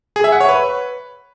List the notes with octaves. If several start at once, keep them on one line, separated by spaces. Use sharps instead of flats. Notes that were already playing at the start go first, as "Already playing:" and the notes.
G#4
E5
F#5
C#5
B4